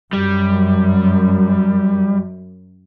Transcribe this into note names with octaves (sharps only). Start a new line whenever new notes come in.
F#2 G3